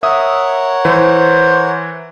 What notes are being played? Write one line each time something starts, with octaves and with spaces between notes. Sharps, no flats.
A#4 C#5 E5 F#5 D#6
E3 C5